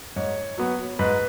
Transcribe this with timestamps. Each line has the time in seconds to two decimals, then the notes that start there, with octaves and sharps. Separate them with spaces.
0.16 G#2 C#5
0.58 F#3 B3
0.99 G#2 B4